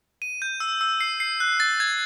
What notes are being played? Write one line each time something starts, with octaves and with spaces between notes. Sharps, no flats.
D#7
G6
E6
E6
C7
C7
F#6
A6
G#6